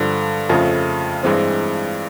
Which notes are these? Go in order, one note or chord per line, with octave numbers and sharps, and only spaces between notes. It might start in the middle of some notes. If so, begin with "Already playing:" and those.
Already playing: G2 D3 F3
F2 C#3 F3 A3
G2 E3 G#3 C4